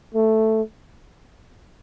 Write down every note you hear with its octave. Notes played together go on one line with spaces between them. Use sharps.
A3